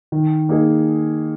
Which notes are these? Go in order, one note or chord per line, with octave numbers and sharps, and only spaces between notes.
D#3
A#3 D#4 G#4